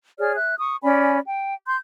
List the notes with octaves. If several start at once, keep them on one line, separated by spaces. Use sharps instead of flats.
G#4 C#5 D5 F6
E5 F#6
C#6 D#6
C#4 D5 G#5 B5
G5
C6 G6